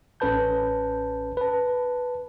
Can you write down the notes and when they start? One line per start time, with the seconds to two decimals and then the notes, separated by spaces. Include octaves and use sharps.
0.20 A1 C#4 A4 B4 A5 G6
1.37 B4 A5